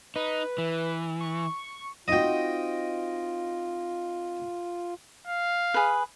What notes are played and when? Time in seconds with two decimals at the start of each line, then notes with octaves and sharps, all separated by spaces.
0.16 D#4 B4
0.58 E3
1.21 C#6
2.08 C4 D#4 F4 F#4 D#5 G5
5.27 F5
5.74 G#4 B4